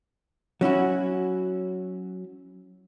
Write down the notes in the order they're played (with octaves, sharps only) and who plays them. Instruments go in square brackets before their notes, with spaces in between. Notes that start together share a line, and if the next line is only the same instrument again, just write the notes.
[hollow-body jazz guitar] F#3 C#4 E4 F#4